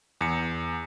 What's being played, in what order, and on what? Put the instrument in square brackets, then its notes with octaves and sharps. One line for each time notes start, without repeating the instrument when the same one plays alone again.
[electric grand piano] E2 C#7